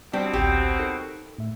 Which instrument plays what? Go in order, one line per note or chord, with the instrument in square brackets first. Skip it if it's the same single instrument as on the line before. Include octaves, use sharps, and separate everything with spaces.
[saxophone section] B2 F#3 C4 [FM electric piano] G3 [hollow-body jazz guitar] D4 G4
[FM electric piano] A1 D2 [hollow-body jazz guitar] G4
[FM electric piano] D#4 A4 A#4
A2 E5